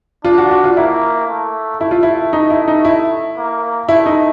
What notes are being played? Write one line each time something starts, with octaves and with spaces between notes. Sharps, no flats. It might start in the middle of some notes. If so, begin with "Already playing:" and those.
D4 F4
F#4
F#4
F4
A#3 E4
A3
A3 E4
F4
E4
D#4
E4
D#4
E4
A#3
A3 E4
D#4